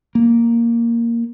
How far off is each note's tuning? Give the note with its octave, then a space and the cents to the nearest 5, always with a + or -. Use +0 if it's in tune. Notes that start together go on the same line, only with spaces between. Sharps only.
A#3 +0